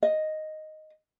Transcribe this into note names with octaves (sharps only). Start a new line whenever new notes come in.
D#5